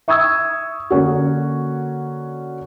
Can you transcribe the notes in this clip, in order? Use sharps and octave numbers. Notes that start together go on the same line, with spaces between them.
E5 C#6 D#6 E6 G#6
D3 A#3 C#4 F#4